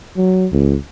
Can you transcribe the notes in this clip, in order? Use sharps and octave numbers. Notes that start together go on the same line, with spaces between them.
F#3
C#2